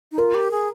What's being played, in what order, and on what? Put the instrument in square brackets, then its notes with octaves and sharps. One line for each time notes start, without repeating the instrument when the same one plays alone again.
[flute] D#4
[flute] F4 [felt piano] A#4
[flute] G4
G#4